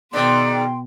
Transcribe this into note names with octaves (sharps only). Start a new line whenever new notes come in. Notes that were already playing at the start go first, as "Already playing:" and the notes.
G#2 B2 D#3 D5 G5 C6